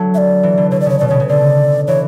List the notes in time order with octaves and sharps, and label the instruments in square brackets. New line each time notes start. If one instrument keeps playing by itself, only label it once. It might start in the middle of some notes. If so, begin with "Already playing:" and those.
Already playing: [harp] D3 F#3 A3
[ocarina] E5
D5
[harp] E3
D3
[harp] D3 [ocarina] C#5
[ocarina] D5
[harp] C#3 [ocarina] C#5
[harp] B2 [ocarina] D5
[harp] C#3 [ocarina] C#5
[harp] C#3
[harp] D3 [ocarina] D5
[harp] E3 [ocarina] C#5